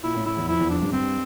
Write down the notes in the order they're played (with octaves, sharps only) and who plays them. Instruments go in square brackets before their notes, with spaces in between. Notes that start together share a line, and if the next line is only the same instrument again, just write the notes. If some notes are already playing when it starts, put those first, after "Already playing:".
[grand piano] A#2 [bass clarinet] E4
[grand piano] A2
[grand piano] A2 [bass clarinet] E4
[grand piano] E2
[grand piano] F2 [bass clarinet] E4
[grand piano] E2
[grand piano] F2 [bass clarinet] D4
[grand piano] G2
[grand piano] G2 [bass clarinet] C4